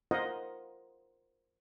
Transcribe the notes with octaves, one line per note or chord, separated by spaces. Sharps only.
F4 A#4 C5 D#5 F5 F#5